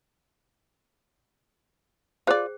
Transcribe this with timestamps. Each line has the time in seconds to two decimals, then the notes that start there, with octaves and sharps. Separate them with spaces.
2.27 F4 G#4 C5 D5 G5